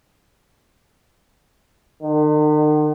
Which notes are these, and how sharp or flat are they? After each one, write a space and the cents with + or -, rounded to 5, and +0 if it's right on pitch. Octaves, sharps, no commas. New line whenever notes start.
D#3 -45